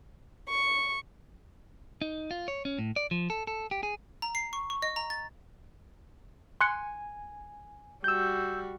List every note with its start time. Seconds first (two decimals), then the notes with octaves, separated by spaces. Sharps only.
0.50 C#6
2.02 D#4
2.31 F4
2.48 C#5
2.65 C#4
2.79 A2
2.96 D5
3.11 F3
3.30 A4
3.47 A4
3.71 G4
3.83 G#4
4.22 A#5
4.35 C7
4.53 C#6
4.70 C#6
4.82 D#5
4.96 A#5
5.10 A6
6.61 G#5 C6 F#6 C#7
8.04 G3 F#4 E6 G6